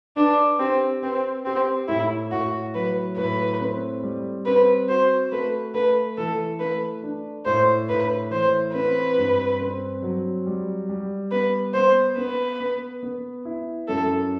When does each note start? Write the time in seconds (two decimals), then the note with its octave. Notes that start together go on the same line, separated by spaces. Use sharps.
0.17 D4 B4
0.60 C4 G4
1.03 C4 B4
1.45 C4 G4
1.88 A2 E4
2.32 A2 F#4
2.75 F#3 B4
3.17 A2 B4
3.61 C4
4.03 G3
4.46 C4 B4
4.89 F#4 C5
5.32 A3 B4
5.74 A3 B4
6.18 E3 A4
6.60 A3 B4
7.03 D4
7.46 A2 C5
7.89 A2 B4
8.31 E3 C5
8.74 C4 B4
9.18 G2
9.61 C4
10.02 F#3
10.46 G3
10.89 G3
11.31 B3 B4
11.74 B3 C5
12.17 B3 B4
12.61 B3
13.03 B3
13.45 E4
13.88 F#2 A4